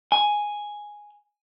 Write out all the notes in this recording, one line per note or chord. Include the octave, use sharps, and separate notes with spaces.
G#5